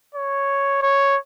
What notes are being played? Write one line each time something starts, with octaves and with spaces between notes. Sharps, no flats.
C#5
C#5